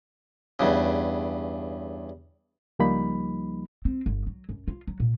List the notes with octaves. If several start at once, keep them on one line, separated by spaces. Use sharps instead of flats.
E2 G2 C#3
C#2 F3 G3 A#3 D#4 B5
C4
G1
F#3
F#2
F4
F#3
A#2